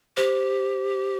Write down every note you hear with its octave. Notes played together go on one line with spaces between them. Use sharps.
G4 C5